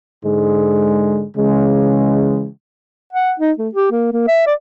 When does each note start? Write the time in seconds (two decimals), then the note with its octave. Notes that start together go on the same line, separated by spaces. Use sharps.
0.24 G#2 D3 G#3
1.37 C#3 E3 G#3
3.13 F#5
3.40 D#4
3.59 A3
3.74 G4
3.91 A#3
4.12 A#3
4.28 E5
4.46 D5